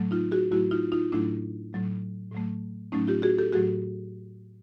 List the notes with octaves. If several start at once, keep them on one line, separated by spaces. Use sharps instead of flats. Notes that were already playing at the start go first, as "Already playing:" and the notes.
Already playing: A2 F#3 A3
D#4 F4
F#4 G#4
A2 F#3 A3 E4 F#4
D#4 F4
D#4 F4
A2 F#3 A3 D4 E4
A2 F#3 A3
A2 F#3 A3
A2 F#3 A3 C#4 D#4
F4 G4
F#4 G#4
G4 A4
A2 F#3 A3 F#4 G#4